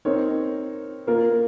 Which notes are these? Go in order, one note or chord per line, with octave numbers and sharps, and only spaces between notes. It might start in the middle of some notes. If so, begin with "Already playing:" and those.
C4 D#4 A#4 C#5
A#3 F4 A#4